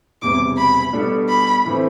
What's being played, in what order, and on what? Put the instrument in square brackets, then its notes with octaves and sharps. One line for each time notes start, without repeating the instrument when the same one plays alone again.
[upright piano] E1 E2 C3 G3 [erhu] D6
[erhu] B5
[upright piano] B2 G3 B3 D4 A4
[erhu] B5
[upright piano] A2 E3 A3 C4